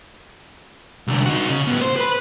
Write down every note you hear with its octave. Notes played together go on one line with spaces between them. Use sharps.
C2 D3
D#4 F#4
C#3
A2 B3
C5
B4 B5